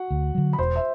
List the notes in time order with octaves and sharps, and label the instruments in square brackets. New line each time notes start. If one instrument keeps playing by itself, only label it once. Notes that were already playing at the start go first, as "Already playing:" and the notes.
Already playing: [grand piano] F#4 F#5
[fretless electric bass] D2
D3 F#3
[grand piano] B5
[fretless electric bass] E1 [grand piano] C5 C6
[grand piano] E5